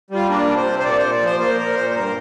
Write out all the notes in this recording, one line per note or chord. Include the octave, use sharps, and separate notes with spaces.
G3 F4
A#3 D4
C3
C5
C3
C5
A#2 D5
A#2 C5
D5
F3 C5
A#3 C5
A#2 A#4
A#2 C5
C5
G2 A#4